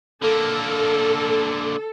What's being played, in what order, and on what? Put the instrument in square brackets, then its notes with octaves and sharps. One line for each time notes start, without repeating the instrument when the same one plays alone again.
[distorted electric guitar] D3 A#3 [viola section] A4